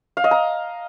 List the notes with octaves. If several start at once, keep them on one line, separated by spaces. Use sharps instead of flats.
F5
D#5
A#5